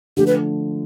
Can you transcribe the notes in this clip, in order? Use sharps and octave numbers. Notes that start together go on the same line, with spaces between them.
D3 F3 A3 G4
B4